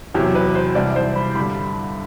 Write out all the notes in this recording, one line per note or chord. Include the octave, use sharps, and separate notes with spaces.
E2 C3 F#3 G4
B4
C5
C2 C3 E3 G3 D5
C5
B5
G2 D3 G3 B5